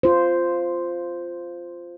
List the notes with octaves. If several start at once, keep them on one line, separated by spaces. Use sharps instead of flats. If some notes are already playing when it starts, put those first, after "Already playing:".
F4 C5